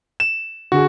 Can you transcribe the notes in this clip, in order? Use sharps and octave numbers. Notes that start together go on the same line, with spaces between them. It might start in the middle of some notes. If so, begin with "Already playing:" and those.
E7
D3 F#4 G#4